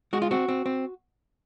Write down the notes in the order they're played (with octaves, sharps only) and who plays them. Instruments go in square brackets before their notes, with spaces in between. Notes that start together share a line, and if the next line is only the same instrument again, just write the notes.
[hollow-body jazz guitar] G#3 F#4
F4
C4 F#4
C4
C4